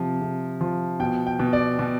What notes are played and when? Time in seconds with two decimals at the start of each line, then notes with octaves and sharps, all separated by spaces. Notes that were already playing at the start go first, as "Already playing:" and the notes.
Already playing: C3 F3
0.21 C3
0.61 F3
1.00 B2 G5
1.27 G5
1.40 B2
1.53 D5
1.79 B2